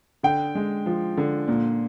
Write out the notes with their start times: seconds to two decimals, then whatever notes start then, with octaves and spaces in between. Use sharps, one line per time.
0.23 D3 G5
0.55 G#3
0.86 F3
1.17 D3
1.48 A#2